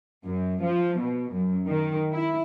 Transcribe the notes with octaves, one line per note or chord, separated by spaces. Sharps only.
F#2
F3
B2
F#2
D#3
E4